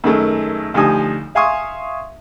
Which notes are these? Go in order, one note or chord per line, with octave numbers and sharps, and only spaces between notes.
F#2 D#3 G#3 A3
D2 F3 G3 D#4 G#5 D#6
E5 F5 G#5 C6 C#6 D#6